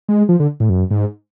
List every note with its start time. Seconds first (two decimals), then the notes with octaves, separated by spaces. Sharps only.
0.09 G#3
0.29 F3
0.40 D3
0.60 A2
0.69 F#2
0.91 G#2